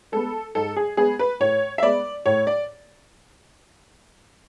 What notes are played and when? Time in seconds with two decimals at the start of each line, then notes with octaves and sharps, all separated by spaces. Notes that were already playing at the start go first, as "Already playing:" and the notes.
0.12 G#3 B3 A4
0.55 G#2 A4
0.76 G#4
0.97 G#3 B3 G#4
1.19 B4
1.40 A2 C#5
1.78 E5
1.83 G#3 B3 D5
2.26 A2 C#5
2.47 D5